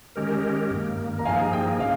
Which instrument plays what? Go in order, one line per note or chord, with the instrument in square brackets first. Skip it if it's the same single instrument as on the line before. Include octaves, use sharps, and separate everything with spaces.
[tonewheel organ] D#3 G#3 C#4 G4 A#4
G2 D#3 A#3
[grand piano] A#5
[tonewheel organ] G2 F3 A#3 D#4 G#4 [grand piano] F5 G#5
[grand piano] G5
[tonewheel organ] C#3 C#4 [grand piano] F5